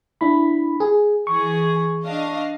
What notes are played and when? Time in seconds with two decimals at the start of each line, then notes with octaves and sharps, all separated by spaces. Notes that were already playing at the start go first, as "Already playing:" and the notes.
0.21 D4 E4 B5
0.80 G#4
1.27 E3 G#4 C#6
2.05 D4 D#5 F5